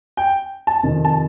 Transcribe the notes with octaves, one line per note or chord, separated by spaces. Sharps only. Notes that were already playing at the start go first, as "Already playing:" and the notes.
G5
A5
F2 C3 D#3
A5